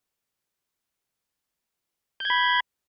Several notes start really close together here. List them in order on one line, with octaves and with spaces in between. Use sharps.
G6 G#6 B5